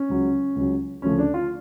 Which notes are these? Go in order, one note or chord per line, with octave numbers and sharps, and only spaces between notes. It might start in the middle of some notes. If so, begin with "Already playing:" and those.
Already playing: C#4
C#2 C#3 F#3
C#2 C#3 F#3
D2 C#3 F3 A3 C#4
D4
F4